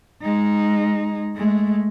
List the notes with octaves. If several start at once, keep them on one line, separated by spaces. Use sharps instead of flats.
G#3 D#4
G#3 A3